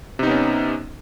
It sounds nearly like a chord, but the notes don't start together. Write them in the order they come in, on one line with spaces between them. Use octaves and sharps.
C3 D#4 B3 C#4